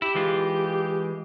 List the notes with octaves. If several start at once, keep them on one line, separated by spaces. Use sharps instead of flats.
E4 G4
E3 G#3 F4